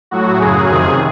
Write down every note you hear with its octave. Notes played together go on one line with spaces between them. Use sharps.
A2 F#3 F#4
F#2 C#3 F#3 G#4
F2 C3 D#3